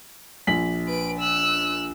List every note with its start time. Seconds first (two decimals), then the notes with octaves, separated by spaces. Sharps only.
0.47 A#1 B6 F#7
0.88 B4 D7
1.20 E6 F#6